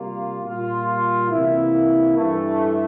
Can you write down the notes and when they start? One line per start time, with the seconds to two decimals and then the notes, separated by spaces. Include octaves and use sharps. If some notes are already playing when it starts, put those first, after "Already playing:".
Already playing: C3 G3 A#3 F4
0.42 A#2 G3 A#3 F4
1.29 C3 E3 A#3 E4
2.17 G2 E3 A3